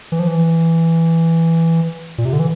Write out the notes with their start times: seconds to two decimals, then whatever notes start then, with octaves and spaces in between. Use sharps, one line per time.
0.12 E3
0.19 F3
0.27 E3
2.18 A#2
2.25 C3
2.33 D3
2.39 E3